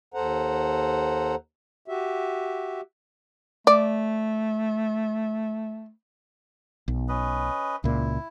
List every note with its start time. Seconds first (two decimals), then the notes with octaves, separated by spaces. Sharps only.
0.14 D#2 A4 C5 F#5 A#5
1.88 F#4 G4 E5
3.67 A3 D5
6.88 B1
7.09 C#4 B4 D#5
7.84 C#2 A#2 E4